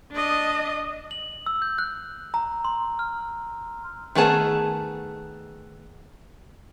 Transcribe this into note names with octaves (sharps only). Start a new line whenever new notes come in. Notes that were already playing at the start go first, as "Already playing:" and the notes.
D4 D#5
F#7
E6
G6
F#6
A#5
C6
F6
D#3 A3 B3 G#4 A5